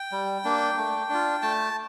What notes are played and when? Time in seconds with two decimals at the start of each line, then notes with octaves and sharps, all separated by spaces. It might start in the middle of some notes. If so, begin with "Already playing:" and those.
Already playing: G5
0.12 G3
0.45 A#3 D4
0.77 A3
1.09 D4 F4
1.42 A3 A5